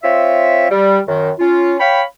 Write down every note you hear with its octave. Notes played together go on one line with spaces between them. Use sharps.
C4 F4 C#5 E5
G3
F#2 D#3
C#4 F4
C#5 F5 G5 B5